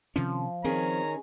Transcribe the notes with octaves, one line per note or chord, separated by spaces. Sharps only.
C3 D#3 F3 C#4
D#3 C4 C#4 G#4 A#5